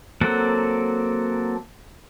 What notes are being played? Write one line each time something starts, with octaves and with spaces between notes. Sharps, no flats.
F#3 A#3 C4 A4 F#5